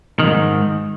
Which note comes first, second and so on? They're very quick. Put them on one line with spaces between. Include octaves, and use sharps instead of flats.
D#3 F2 G#2